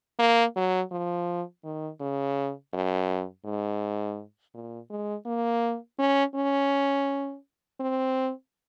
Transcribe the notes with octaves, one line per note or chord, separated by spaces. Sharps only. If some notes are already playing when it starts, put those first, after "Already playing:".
A#3
F#3
F3
D#3
C#3
F#2
G#2
A#2
G#3
A#3
C#4
C#4
C4